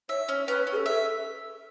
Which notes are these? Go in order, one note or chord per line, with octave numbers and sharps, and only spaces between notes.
C#5 E5
C#4 C#5
C#4 B4
C#4
G#4
A4
E5